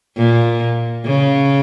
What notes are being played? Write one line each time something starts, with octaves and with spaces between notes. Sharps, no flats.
A#2
C#3